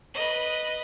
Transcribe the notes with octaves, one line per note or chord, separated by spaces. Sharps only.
B4 D#5